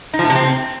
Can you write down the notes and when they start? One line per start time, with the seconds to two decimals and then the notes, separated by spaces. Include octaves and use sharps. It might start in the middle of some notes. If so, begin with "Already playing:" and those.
0.14 D#4
0.19 F3
0.24 A2
0.30 C3
0.35 C4